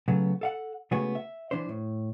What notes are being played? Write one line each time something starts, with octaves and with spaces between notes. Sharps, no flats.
C#3 F#3 A3 B3
A4 F5 F#5
C#3 G#3 A3 B3 F#4 G#5
E5
E3 D4 E4 C5
A2